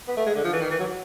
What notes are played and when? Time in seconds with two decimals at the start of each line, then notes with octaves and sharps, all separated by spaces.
0.08 B3
0.17 A3
0.26 G#3
0.35 D3
0.44 F3
0.53 E3
0.61 D#3
0.71 E3
0.80 F#3